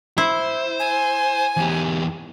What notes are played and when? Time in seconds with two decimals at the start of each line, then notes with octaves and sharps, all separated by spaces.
0.18 E4 C5
0.80 G#5
1.57 E2 G4